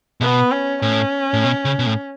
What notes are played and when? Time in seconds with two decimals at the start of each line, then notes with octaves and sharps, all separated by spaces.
0.21 B2 B3
0.51 C#4
0.82 A2 C#4
1.34 A2
1.45 B2
1.65 C#3
1.79 B2
1.86 A2